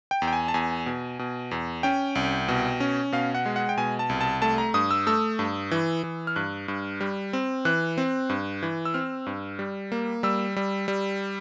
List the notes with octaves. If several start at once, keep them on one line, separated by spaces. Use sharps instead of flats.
G5
E2
G5
G#5
A5
E2 G#5
B2
B2
E2
C#4 G5
C2
B2
C#4
B2 F5
F#5
G#3
F#5
G5
B2 G#5
A5
C2
A5
A3 A5
A#5
G2 D#6
E6
A3 E6
G2
E3
E3
F6
G2 F#6
G2
G3
C4
E3 F#6
C4
G2
E3
E6
C4 F6
G2
G3
A#3
G3 E6
G3
G3